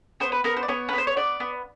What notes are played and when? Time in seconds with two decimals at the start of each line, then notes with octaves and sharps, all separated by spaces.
0.20 B3 C5
0.32 B4
0.44 B3 A#4
0.57 C5
0.63 D5
0.68 B3 C#5
0.89 B3 B4
0.98 C5
1.07 C#5
1.17 B3 D5
1.40 B3